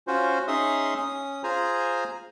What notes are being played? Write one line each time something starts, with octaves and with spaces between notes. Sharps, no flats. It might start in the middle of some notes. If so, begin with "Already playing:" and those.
C#4 F4 F#4 C5
C#4 D#4 G#4 E5 C6 D#6
C#4 D#6
F4 G#4 C5 G#5 A#5